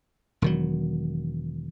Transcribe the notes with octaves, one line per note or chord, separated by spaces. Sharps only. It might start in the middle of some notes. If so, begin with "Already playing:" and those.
E1 D#3 F#3